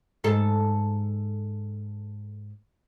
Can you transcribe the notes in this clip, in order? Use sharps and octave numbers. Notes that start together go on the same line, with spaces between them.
G#2 A4